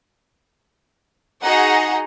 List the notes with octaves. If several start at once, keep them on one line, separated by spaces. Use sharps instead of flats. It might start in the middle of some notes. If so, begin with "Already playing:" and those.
D#4 F#4 G#4 D#5 F#5 A#5